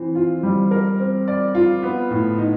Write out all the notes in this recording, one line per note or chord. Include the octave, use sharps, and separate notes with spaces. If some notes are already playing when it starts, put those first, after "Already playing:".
Already playing: E3 C4
F4
G3
A#4
C4
D5
F4
B3
A2
D#4